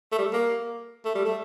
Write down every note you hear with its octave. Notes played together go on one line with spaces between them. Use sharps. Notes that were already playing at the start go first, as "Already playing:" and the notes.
A3
G3
A#3
A3
G3
A3